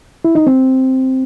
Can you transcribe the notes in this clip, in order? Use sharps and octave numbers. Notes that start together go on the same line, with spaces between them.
E4
D#4
C4